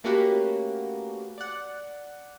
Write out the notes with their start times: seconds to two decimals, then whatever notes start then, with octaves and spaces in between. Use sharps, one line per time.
0.04 A3 A#3 C#4 F#4 G4 B4
1.38 D5 F#5